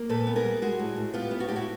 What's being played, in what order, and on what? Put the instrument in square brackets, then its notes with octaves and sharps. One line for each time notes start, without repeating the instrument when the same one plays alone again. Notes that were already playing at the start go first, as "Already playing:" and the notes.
Already playing: [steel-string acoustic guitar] A#3
A#2 A4 B4
B3
G#4 A#4
G3
G#3 F#4 G#4
A2
A2
B3 F4 G4
B3
F#4
A2 G4
E4 F#4